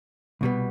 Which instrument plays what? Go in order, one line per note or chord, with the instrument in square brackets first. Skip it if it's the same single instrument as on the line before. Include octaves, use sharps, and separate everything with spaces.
[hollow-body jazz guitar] C2 B2 G3 B3